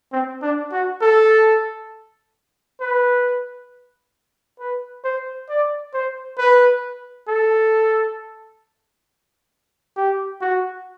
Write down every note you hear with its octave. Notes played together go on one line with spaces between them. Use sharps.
C4
D4
F#4
A4
B4
B4
C5
D5
C5
B4
A4
G4
F#4